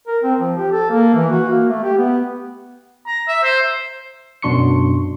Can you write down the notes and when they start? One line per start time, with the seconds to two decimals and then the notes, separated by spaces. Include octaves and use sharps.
0.07 A#4
0.23 C4
0.40 F3
0.57 G4
0.72 A4
0.91 A#3
1.15 E3
1.31 F#4
1.49 A#3
1.70 A3
1.83 G4
1.97 B3
3.07 A#5
3.28 E5
3.43 C5
4.42 F#2 B2 D4 C6 C#6 C#7